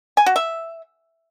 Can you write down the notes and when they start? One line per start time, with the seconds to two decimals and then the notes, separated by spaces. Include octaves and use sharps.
0.17 G#5
0.26 F#4
0.36 E5